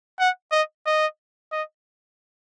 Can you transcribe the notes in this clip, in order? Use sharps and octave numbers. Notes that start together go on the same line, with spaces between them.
F#5
D#5
D#5
D#5